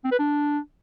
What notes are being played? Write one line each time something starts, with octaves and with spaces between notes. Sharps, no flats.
C4
B4
D4